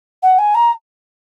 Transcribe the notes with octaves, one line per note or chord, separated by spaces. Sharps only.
F#5
G#5
A#5